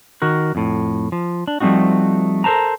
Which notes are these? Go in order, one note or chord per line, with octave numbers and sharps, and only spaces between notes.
D#3 F#4 A#4
F2 A2
F3
D4
F3 G3 A3 C4 D#4 F#4
A4 A#4 C5 A5 A#5